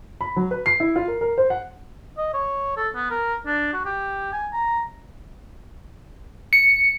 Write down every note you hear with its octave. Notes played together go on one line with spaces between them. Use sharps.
B5
F#3
B4
C7
E4
F4
A#4
A#4
C5
F#5
D#5
C#5
A4
B3
A#4
D4
F#4
G4
G#5
A#5
C#7